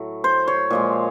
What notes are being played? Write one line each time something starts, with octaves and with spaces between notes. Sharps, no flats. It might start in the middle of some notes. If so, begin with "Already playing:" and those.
Already playing: A2 F#3 A3
C5
C#5
A#2 F3 G#3